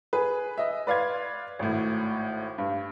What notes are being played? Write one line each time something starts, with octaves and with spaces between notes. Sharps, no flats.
G#4 B4
D#5 E5
B4 D5 F5 C6 G#6
G#1 A2
G2